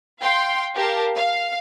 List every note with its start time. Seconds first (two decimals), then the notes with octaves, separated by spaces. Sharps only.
0.19 F5 G5 C6
0.75 G4 A#4 F5 A5
1.15 F5